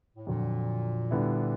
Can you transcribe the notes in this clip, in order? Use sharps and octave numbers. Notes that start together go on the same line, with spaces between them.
A2
F2 A#2 D3 F#3
D3 G3 B3 E4